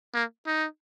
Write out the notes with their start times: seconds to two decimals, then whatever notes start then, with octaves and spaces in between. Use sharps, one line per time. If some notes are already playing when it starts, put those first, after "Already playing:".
0.14 A#3
0.46 D#4